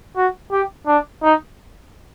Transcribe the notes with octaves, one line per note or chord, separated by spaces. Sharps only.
F#4
G4
D4
D#4